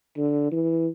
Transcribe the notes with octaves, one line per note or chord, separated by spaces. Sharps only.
D3
E3